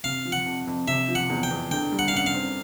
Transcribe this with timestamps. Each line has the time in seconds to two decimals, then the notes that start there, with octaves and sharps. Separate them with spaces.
0.04 C3 F5
0.25 F3
0.32 F#5
0.45 F2
0.67 F2
0.87 C3 E5
1.08 F3
1.15 F#5
1.30 E2
1.43 G5
1.50 E2
1.71 D3 G5
1.92 G3
1.99 F#5
2.08 F5
2.13 F#2 F#5
2.26 F5
2.34 C4